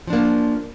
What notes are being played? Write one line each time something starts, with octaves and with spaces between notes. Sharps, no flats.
F3 A#3 D4